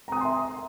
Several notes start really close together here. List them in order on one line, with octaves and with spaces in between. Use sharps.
A#5 D#6 G#5 C6 E5